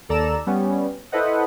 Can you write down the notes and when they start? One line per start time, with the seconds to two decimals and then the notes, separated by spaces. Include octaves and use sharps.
0.09 D#2 A4 D5 A#5 E6 E7
0.47 G3 B3 C#4
1.12 E4 A4 B4 C5 D#5 F#5